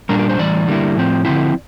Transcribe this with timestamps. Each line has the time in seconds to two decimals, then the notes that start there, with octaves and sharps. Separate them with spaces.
0.09 A#2 G3 D4 A#4
0.19 A#4
0.29 C5
0.39 A2 E3 G3 D5
0.68 D3 G3 A#3 E4
0.96 A2 F3 C4
1.25 D3 F3 C4 E4